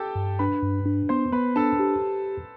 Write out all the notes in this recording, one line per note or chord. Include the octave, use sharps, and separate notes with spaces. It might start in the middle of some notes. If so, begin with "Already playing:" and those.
Already playing: G4 A4 G5 A5
G2
D4 B4 B5
G2
D4
B3 C5 C6
B3 B4 B5
D4 A4 A5
G4